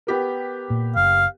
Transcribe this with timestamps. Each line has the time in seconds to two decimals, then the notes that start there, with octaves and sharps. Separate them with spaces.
0.07 B3 G4 A#4
0.70 A#2
0.96 F#1 F5